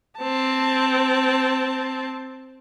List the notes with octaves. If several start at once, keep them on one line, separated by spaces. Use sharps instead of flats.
C4 A5